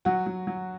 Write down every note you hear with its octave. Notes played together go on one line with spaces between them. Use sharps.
F#3 F#4
F#3
F#3